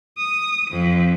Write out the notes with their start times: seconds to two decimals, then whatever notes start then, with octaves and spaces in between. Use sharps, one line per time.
0.19 D#6
0.70 F2